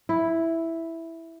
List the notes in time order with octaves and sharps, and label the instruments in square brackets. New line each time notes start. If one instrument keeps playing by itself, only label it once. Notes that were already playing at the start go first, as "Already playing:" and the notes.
[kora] E4